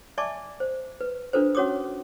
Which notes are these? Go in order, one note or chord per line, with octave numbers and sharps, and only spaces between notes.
D5 E5 G#5 A5 C#6 D6
C5
B4
D4 F4 A4 B4 C5
C#4 F#4 C#5 D6 D#6